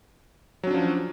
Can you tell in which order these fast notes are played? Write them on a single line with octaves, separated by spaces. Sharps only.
F#3 C#4 D4 F3